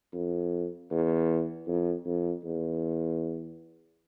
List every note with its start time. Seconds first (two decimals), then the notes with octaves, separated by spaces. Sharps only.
0.13 F2
0.91 E2
1.67 F2
2.06 F2
2.45 E2